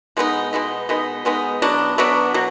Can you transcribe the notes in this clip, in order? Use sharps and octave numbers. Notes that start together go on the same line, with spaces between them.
B2 G#3 B3 D#4
B2 G#3 B3 D#4
B2 G#3 B3 D#4
B2 G#3 B3 D#4
B2 F#3 B3 D4
B2 F#3 B3 D4
B2 F#3